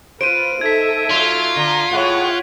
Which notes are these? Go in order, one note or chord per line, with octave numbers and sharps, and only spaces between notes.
F4 B4 C5 D7 D#7
D#4 A4 E5 G#6 B6
F#3 F4
D3 A#5
A2 G#3 C#5 F#5